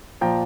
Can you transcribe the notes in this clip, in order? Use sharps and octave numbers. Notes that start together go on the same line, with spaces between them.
A#2 F3 G5 A#5